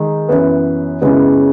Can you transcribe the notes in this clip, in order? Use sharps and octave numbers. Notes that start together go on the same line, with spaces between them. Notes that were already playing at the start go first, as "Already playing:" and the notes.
Already playing: D#3 G#3
F#2 E3 B3
F#2 C#3 G#3 B3 E4